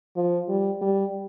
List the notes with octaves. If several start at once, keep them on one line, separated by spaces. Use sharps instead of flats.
F3
G3
G3